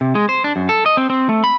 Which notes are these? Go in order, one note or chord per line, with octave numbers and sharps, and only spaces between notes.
C3
G#3
C5
D4
F#2
A4
D#5
C4
C4
A3
B5